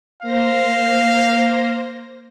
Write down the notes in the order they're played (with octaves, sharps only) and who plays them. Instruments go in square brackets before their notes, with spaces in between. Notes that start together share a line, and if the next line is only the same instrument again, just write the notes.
[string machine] A#3 C5 A#6 [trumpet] F5